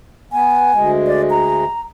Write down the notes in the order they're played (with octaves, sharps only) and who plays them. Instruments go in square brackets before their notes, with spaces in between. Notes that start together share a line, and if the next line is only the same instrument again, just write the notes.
[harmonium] B3 [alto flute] G#5
[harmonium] D2 G#3
[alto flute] D5
A#5